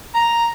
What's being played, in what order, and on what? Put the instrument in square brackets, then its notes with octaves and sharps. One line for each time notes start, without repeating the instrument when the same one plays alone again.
[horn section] A#5